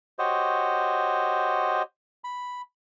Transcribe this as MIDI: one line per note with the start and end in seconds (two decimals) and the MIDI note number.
0.19 1.82 66
0.19 1.82 67
0.19 1.82 72
0.19 1.82 73
0.19 1.82 75
2.24 2.62 83